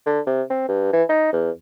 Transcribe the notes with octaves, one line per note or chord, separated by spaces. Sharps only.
D3
C3
C4
G2
E3
D#4
E2